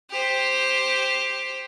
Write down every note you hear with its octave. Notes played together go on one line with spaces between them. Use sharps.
G4 C5